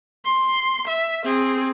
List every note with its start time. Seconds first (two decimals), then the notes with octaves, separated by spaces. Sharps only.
0.25 C6
0.88 E5
1.24 C4 G#4